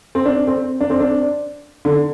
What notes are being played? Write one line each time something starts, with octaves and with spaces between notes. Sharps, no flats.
C4
D4
C4
D4
C4
D4
D3